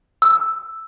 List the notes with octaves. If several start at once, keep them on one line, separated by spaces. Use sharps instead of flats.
E6